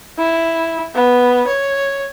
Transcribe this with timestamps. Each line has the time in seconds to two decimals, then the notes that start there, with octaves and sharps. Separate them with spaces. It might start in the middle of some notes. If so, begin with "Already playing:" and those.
0.18 E4
0.94 B3
1.47 C#5